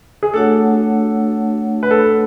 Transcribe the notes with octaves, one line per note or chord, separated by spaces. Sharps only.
G#4
A3 D4 F#4 A4 C#5 F#5
B4
A4